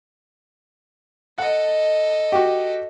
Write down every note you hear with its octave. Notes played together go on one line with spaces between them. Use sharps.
A4 D#5 F#5
F#4 G4